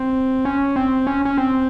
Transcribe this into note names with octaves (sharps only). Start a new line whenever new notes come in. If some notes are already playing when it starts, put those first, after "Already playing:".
Already playing: C4
C#4
C4
C#4
C#4
C4